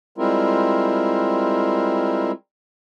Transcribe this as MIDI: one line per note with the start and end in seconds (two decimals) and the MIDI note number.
0.18 2.31 55
0.18 2.31 56
0.18 2.31 60
0.18 2.31 64
0.18 2.31 65
0.18 2.31 70